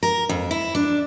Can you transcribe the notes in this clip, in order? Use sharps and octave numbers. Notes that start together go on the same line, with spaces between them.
A#4
F2
E4
D4